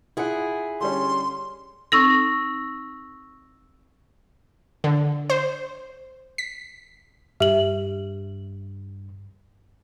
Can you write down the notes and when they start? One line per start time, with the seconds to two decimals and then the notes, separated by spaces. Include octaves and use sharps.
0.17 E4 F4 G#4 F#5
0.81 D3 G3 C#4 C6
1.92 C4 D#4 A4 C#6 E6 A#6
4.84 D3
5.30 C5
6.38 B6
7.40 G2 G4 E5 F#7